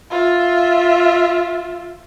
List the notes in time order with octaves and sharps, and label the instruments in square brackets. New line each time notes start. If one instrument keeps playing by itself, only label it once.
[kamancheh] F4 E5